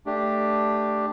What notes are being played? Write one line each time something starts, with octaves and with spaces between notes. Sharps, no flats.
A3 D4 G4